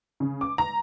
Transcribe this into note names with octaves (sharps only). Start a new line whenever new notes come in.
C#3
D6
A#5